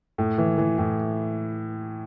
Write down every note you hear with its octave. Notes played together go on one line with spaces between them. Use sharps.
A2
E3
E3
A2